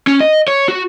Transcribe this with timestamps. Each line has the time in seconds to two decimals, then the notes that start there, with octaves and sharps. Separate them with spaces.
0.07 C#4
0.21 D#5
0.48 C#5
0.68 F#4